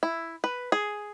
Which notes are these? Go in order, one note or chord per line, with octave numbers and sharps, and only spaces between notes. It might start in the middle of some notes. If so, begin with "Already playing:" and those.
E4
B4
G#4